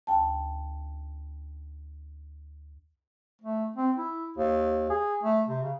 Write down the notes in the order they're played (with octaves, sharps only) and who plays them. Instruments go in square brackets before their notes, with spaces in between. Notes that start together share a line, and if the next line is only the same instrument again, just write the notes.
[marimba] D2 G5 A5
[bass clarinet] A3
C4
E4
D#2
G#4
A3
C3
C#3